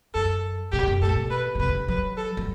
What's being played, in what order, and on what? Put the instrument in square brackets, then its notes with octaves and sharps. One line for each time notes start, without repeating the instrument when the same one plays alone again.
[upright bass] F#2 [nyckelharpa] A4
[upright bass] B2 [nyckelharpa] G4
[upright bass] F#2
[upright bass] A2 [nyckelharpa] A4
[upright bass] B2
[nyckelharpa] B4
[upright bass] B2
[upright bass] C3 [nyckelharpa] B4
[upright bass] D3
[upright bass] F#3 [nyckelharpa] B4
[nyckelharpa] A4
[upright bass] F#3